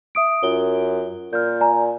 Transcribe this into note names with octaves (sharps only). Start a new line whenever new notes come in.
E5 D#6 D7
F#2 F4 G7
A#2 F6 G6
D5 G#5 A#5